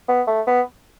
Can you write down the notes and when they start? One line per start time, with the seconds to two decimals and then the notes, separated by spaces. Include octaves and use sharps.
0.08 B3
0.27 A3
0.47 B3